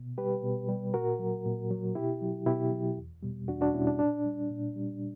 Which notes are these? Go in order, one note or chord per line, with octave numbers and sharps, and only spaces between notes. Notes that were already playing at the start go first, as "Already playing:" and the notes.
Already playing: B2
G3 G4 B4
B2
G3
A#2 F#4 A#4
F#3
A#2
F#3
B2 E4 G4
F#3
B2 E4 G4
F#3
E2
B2 G3
E2 D4 F#4
D4 F#4
B2 G3 C#4 E4
D4
A#2 D4
G3
A#2
G3